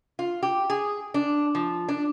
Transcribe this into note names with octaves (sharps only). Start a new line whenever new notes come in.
F4
G4
G#4
D4
F3
D4